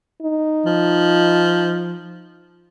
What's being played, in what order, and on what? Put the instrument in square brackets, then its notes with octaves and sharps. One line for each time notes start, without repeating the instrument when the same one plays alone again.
[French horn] D#4
[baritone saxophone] F3